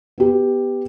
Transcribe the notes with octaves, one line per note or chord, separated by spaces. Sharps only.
B3 G4